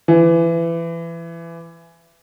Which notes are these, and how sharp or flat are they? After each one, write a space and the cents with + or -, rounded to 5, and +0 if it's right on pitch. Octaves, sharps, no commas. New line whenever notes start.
E3 +25